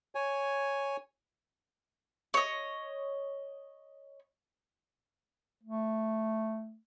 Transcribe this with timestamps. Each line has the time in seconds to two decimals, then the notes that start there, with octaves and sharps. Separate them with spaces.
0.15 C#5 G#5
2.34 C#5 D#5
5.63 A3